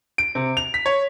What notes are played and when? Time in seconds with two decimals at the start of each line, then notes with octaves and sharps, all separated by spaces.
0.18 D7
0.35 C3
0.57 F7
0.74 B6
0.86 C#5